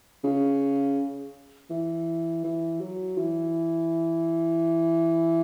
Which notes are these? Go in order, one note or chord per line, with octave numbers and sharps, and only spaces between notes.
C#3
E3
E3
F#3
E3